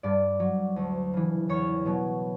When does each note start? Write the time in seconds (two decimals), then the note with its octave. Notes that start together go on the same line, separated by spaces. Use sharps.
0.03 G2 D5
0.40 F#3
0.76 D2
1.13 C#3 E3
1.49 E2 C#5
1.86 B2 F#3